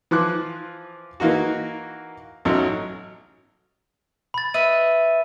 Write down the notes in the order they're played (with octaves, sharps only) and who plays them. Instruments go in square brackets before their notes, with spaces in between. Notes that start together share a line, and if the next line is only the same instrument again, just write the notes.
[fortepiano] E3 F3 D6 F#6
E3 A#3 D#4 F#4
A1 F#3 C#4 D#4
[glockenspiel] B5 A6
[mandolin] B4 D#5 E5 [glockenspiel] D#7